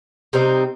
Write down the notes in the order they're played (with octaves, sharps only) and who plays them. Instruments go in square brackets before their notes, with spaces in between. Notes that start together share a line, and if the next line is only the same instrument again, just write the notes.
[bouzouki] C3 G3 C4 D#4